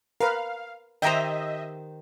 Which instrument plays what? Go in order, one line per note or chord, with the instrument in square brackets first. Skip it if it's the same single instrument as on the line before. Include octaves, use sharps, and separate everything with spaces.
[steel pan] A#4 B4 [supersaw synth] F5
[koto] D#3 G4 C5 [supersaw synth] D#5 E5 [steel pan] G5 A#5